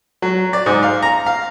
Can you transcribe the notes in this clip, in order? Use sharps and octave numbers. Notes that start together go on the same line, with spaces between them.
F#3
D5
G#2
F5
A#5
F5